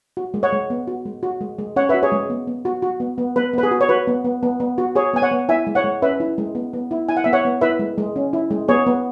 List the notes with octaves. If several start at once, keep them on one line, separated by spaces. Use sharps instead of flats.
F#4
G#3
C#5 F#5
G#3
B3
F#4
G#3
F#4
G#3
G#3
C#4 C#5 F#5
B4 E5
F#4
G#4 C#5
G#3
B3
B3
F#4
F#4
B3
B3
B3 B4
B3 B4
G#4
F#4
C#5
F#4 B4
B3
B3
B3
B3
F#4
F#4 G#4 C#5
B3 G#5
C#5 F#5
B3
E4 E5 G#5
G#3
C#5 F#5
G#3
C#4 B4 E5
E4
G#3
B3
B3
E4
E4 G#5
F#5
B3 E5
C#5 F#5
B3
E4 B4 E5
G#3
G#3
C#4
E4
G#3
B3 G#4 C#5
B3